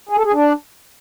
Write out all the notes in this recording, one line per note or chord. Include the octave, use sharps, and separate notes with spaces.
G#4
A4
G#4
D4